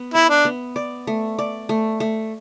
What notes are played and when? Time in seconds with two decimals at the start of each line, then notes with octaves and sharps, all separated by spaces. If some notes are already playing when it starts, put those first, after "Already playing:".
Already playing: B3
0.14 E4 E5
0.30 D4
0.45 B3
0.76 D5
1.07 A3
1.39 D5
1.69 A3
2.00 A3